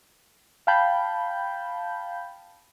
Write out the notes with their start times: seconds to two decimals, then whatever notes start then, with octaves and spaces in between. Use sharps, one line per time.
0.67 F5 G5 A5 B5 G6